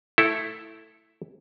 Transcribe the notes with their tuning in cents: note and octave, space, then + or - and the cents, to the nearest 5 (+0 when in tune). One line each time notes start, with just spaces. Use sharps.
A3 +5 E4 +0 A4 +0